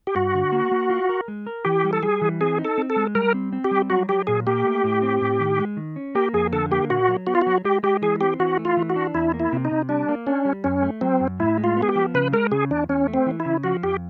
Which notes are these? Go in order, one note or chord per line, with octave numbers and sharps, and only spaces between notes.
G4
G2 F#4
D3
A#3
A#3
F4
A#4
G#3
A#4
E3 G4
G3
A4
G3 G#4
E3
C4 G#4
D#4
A4
C4
A4
G#3
G3 A#4
C4
C4
G4
G3
F#3 F#4
F#3 G4
A#2 G#4
A#3 G4
A3
A2
C4
A2
D#3
G#3
D#3
C#4
A#3 G4
F2 G#4
D3 A4
A#3 G4
A#2 F#4
F#3
B3 F#4
F4
F#4
F#3
G#3 G4
G#3 G4
E3 G#4
C4 G4
E3 F#4
A3
F4
E3
F#4
D4
E2 E4
A#3
E4
C3
D#4
C3
G3 D4
A#3
C#4 D4
G3
F#2 C#4
A3
F#3 C4
F#2
A2 E4
G#3
F4
B3
G#4
G4
F3
C#3 B4
G#3 A#4
C#3 G#4
E2 D4
E2 C#4
A3
C4
E3
E4
C#3
F3 F#4
F2 G4